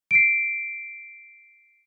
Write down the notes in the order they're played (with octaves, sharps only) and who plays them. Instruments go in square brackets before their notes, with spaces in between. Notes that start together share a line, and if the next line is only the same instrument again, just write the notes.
[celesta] C7 D7